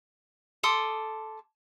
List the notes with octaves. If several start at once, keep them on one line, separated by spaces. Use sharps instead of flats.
A4 C6 D6 D#6